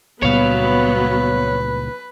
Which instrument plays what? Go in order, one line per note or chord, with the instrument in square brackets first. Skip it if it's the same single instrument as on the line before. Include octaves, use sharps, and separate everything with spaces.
[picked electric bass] C#2 A#2 G3 [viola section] F#3 B3 [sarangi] B4 [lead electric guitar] C#5 F5